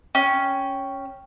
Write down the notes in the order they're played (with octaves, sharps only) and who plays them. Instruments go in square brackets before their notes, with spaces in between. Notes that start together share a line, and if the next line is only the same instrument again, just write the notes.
[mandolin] C#4 [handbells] G5